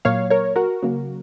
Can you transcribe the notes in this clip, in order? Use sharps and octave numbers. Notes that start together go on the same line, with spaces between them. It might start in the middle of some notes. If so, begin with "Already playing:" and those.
A#2 F#3 A#3 C#5 F5
A#4 C#5
F#4 A#4
C#3 F#3 A#3